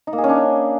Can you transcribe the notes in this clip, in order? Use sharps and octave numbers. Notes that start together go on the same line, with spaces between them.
D#4
A#3
G#4
C#4
D4